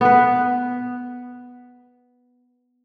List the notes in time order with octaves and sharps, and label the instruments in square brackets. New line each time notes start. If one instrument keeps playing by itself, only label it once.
[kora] B3 B4